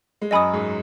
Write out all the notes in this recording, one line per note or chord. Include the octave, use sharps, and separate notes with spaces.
G#3
F#2 F#3 D#5 G#5 B5 D#6
G#2 G#3